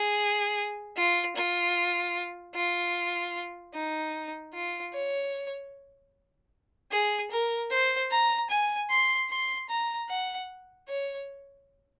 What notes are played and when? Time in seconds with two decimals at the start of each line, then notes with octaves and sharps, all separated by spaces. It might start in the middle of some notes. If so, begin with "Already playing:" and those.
Already playing: G#4
0.97 F4
1.36 F4
2.55 F4
3.74 D#4
4.53 F4
4.93 C#5
6.92 G#4
7.31 A#4
7.71 C5
8.11 A#5
8.50 G#5
8.90 C6
9.30 C6
9.69 A#5
10.09 F#5
10.88 C#5